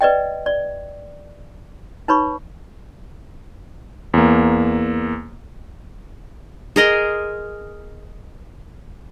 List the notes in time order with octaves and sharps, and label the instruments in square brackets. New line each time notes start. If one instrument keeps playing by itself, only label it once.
[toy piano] B4 D5 D#5 G5
D5
D#4 B4 C#5 B5 C#6
[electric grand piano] E2 A#3
[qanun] G#4 A#4 D#5 C6